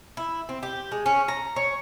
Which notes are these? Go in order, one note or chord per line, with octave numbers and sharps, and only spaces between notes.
E4
C4
G4
G#3
C#4
A#5
C#5